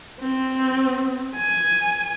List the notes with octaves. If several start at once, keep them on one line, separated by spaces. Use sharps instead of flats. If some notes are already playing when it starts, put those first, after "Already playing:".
C4
G#5